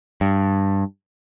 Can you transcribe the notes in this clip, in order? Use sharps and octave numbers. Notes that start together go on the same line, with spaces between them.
G2